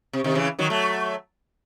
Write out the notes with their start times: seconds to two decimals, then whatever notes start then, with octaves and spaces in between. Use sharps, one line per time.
0.13 C3
0.24 C3 D#3
0.35 C#3 E3
0.59 D#3 F#3
0.70 F#3 A3